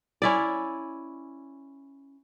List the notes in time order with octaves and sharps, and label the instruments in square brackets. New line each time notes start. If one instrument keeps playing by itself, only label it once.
[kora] C#4 E4 D5